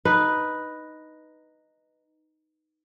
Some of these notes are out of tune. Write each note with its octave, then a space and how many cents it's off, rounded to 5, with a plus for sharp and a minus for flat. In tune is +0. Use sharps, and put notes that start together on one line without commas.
D#4 +0 B4 +0